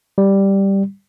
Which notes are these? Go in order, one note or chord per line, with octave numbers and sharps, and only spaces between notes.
G3